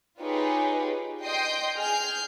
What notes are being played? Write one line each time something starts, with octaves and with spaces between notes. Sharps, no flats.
D#4 F4 G4 G#4 B4 C#5
D#5 G5 C6 D#6 G6 C7
G#4 G#5 F6 G6